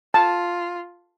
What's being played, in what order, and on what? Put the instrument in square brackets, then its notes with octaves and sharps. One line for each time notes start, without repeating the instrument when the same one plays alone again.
[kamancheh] F4 [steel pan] A5